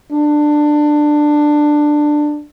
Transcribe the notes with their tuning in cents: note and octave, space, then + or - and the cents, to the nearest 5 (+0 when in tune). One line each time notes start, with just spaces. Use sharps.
D4 +15